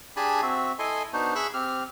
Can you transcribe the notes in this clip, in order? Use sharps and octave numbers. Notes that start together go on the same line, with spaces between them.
D4 G4 G#4 G#5 A5 B5
C4 F#4 E5
E4 A4 D#5 G#5 C6
B3 D4 D#4 F#4 C5
G#4 E5 B5 C#6 E6 F#6
C4 G4 F6